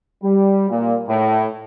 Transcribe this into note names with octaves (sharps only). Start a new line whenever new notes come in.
G3
A#2
A2